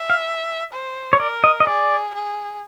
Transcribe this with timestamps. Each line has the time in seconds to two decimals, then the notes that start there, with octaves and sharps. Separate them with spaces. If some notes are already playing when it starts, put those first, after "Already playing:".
Already playing: E5
0.10 F5
0.73 C5
1.13 C#5
1.20 A#4 D5
1.44 D#5
1.60 D#5
1.67 G#4 D5
2.14 G#4